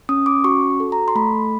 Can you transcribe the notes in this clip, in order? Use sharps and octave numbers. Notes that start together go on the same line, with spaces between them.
C#4 D#6
D6
F#4 C#6
A4
A#5
C6
A3 B5